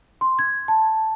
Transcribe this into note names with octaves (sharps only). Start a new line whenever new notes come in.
C6
G#6
A5